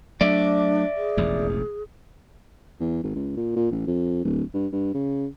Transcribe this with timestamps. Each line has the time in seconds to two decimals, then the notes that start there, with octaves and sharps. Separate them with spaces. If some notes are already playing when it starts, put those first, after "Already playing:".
0.21 F#3 A3 D4 D5 E5
0.97 G#4
1.17 E1 A1 F2
2.80 E2
3.03 G#1
3.15 C#2
3.37 A#2
3.56 A#2
3.71 A1
3.87 F2
4.24 D1
4.54 G2
4.72 G2
4.94 C#3